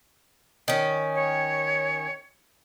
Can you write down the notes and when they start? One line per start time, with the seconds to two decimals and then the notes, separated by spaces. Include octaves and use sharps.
0.68 D#3 C#4
1.15 C#5